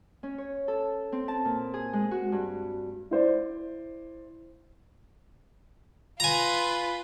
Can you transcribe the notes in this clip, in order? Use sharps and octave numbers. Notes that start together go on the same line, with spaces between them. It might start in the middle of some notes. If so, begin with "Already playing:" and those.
C#4
C#5
A4
C4
A5
A#2
G#4
G#3
F#4
G2
E4 C5 D5
F4 B4 G#5 A#5